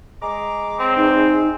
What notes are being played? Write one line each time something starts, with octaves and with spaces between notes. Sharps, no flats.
G#3 A#5 D6
C4 C#5 G5 A#5
E2 D#4